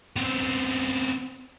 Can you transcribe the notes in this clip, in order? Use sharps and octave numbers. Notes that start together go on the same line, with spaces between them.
B3 C4